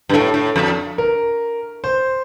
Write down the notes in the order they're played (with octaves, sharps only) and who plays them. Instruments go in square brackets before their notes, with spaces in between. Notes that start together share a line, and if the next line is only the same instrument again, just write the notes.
[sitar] G2
[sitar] A2 [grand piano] A4
[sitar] A2
F2
[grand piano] A#4
C5